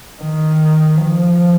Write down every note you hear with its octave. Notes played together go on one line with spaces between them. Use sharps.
D#3
F3